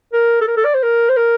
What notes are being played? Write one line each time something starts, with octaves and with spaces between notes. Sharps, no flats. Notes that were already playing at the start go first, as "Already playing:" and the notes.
A#4
A4
A#4
A4
D5
C5
A#4
C5
A#4